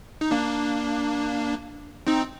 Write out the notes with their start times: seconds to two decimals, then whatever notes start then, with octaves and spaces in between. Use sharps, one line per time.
0.21 D#4
0.31 A#3 D4
2.07 C4 D#4